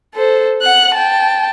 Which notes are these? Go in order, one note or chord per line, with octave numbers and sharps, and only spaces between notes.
A4 C5
F#5 F#6
G5 A5